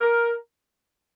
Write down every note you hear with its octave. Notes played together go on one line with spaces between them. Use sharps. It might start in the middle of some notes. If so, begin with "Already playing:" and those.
A#4